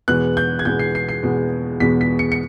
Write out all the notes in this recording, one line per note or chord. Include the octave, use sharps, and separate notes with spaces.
E2 B2 G#3 B3 F#6
G6
G#6
E2 B2 G#3 B3 G6
C7
C7
C7
E2 B2 G#3 B3
E2 B2 G#3 B3 B6
B6
C#7
C#7